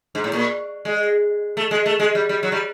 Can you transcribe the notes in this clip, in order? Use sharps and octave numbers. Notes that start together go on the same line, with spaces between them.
G#2
A2
A#2
G#3
A3
G#3
A3
G#3
G3
G3
F#3
G3